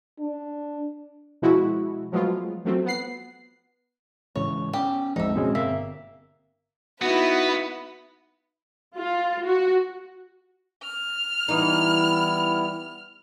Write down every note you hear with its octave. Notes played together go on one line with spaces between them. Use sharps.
D4
B2 F3 G#3 E4 F#4
F3 F#3 G#3 A3 B3 F4
F3 F#3 A3 C4
B3 F#5 C7
G#2 C#3 E3 C#5
B3 C#4 G4
A#1 F2 G#2 D3 F3 D#4 E5
B2 G#3 C4 C#4
G1 A#3 E5
B3 D#4 E4 F#4 B4
F4
F#4
F6
E3 G3 B3 D#4 E4